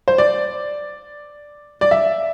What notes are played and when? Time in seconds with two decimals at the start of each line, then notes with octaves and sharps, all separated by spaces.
0.08 C5
0.18 D5
1.81 D5
1.91 E5